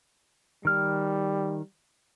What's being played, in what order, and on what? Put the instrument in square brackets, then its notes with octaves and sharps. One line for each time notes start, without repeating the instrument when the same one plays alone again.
[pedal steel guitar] D#3 F6 [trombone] G3